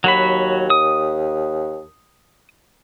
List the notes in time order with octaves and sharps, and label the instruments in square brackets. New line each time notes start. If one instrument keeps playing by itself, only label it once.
[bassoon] D#2 [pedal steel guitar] F#3 F#4 B5
[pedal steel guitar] D#6